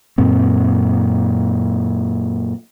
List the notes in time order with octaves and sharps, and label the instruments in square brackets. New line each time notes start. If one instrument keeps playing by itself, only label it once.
[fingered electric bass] F#2 A#2 C4